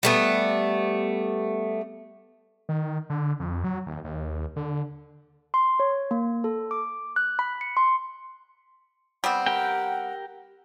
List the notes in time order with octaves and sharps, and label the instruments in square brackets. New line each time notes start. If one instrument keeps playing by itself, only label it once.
[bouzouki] G3 A3 B3
[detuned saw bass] D#3
D3
F2
F#3
D#2
D#2
D3
[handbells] C6
C#5
A#3
A4
D6
F#6
B5
C#7
C6
[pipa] G3 B3 C4 [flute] F#5
[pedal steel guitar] G4 A#4 G5